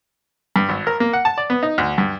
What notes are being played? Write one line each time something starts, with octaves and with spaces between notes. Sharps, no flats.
G2
G#1
A#4
A#3
F#5
A5
D5
B3
D#4
D2
G2